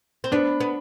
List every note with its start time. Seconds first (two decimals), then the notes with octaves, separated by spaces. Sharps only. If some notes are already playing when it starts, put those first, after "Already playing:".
0.24 C4
0.32 B3 D4
0.60 B3